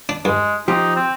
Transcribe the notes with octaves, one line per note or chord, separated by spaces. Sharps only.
D4
G2 G#3
F3 D#4 G4
C4